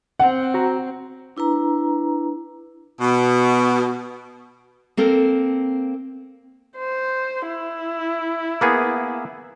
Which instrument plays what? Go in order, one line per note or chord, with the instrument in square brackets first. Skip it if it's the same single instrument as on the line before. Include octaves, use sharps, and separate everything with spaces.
[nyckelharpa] C4 [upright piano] F#5
[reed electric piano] F#4 A#5
[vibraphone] D4 E4 B4 A#5
[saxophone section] B2
[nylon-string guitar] A#3 C4 A4 A#4
[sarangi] C5
E4
[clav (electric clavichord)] A#3 B3 G#4